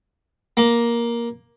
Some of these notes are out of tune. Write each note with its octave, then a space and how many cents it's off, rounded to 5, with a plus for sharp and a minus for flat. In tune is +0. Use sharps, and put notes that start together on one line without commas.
A#3 +10